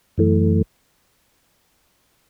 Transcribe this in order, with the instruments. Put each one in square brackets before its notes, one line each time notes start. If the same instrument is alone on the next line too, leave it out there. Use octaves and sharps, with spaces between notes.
[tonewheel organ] F#2 E3 A3